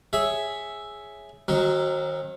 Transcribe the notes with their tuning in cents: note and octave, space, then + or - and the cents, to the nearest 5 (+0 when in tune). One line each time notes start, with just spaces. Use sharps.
G#4 +0 C#5 +0 E5 +0
D#3 +0 F#3 +0 C4 +45